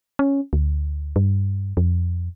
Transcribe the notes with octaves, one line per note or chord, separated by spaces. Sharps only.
C#4
D2
G2
F2